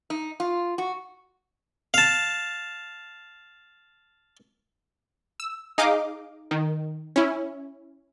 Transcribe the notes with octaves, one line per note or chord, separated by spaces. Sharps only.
D#4
F4
F#4
F5 A5
E6
D#4 G#4 D#5 F5 D6
D#3
C#4 E4